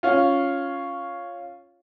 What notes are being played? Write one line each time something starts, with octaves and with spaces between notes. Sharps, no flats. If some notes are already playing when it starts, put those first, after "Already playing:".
C#4 F4